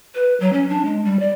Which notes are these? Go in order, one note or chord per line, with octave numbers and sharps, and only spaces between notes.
B4
F#3
C#4
D4
G#3
G3
D5